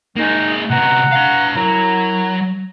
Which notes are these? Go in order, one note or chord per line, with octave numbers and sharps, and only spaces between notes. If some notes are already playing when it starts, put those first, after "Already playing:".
G#3 A#3 D#4 G#4
C3 B3 F#5 A#5
B4 F5
F#2 F#3 E4 A#5